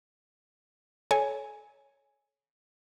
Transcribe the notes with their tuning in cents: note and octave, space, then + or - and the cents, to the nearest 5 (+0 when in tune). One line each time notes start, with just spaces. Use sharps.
A4 -35 C#5 +0 G#5 +0